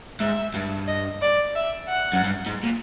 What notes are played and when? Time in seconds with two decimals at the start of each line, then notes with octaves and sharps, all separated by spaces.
0.20 G#2 E5
0.54 G2
0.87 D#5
1.22 D5
1.56 E5
1.89 F#5
2.13 F#2
2.24 G2
2.46 G#2
2.63 A#2